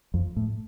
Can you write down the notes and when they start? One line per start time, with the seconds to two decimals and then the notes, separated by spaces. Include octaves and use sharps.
0.14 F2
0.36 A2